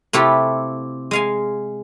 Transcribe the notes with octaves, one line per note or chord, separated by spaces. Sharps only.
C3 A3 E4 F4 G4
G#3 F5 G#5